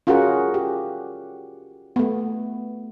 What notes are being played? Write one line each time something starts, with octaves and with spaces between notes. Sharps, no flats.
C#4 F4 F#4 G#4 A#4 F#5
G4
A3 B3